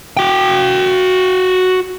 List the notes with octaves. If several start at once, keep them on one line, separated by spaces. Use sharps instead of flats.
F#4 G5